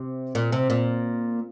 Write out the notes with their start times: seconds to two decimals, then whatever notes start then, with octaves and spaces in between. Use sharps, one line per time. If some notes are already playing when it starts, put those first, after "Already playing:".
Already playing: C3
0.35 A#2
0.52 C3
0.70 A#2